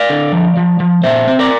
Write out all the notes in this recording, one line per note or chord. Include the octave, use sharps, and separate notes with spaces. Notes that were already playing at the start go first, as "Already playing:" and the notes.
Already playing: D5 F5
D3
F3
F3
F3
A#2 C5 E5
C4
A#4 D5